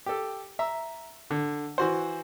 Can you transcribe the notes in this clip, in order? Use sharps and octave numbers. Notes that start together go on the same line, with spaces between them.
G4 A4
E5 A#5
D3
E3 F#4 C5